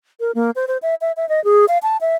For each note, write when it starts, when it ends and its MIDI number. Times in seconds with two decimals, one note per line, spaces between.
0.20 0.31 70
0.35 0.51 58
0.56 0.65 72
0.68 0.78 72
0.82 0.95 76
1.01 1.12 76
1.17 1.28 76
1.29 1.43 75
1.44 1.65 68
1.68 1.78 77
1.83 1.97 81
2.01 2.16 76